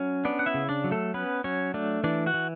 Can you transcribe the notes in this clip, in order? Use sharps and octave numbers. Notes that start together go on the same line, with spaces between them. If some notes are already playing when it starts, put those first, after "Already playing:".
Already playing: F#3 C#4
B3 D4 D5
F#5
E4 E5
C#3
D4 D5
F#3
A3 A4
B3 C#4 B4
F#3 C#4 C#5
A3 D4 D5
E3 D4 D5
F#4 F#5
E3